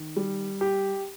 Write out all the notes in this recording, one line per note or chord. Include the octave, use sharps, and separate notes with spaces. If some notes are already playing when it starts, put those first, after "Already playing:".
Already playing: D#3
G3
G4